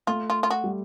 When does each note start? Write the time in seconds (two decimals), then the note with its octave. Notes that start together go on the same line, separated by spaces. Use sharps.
0.07 A3 F4
0.30 F4
0.43 F4
0.50 F#4
0.64 G3